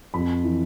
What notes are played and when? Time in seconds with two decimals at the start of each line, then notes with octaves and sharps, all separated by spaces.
0.14 F2 B5
0.44 E3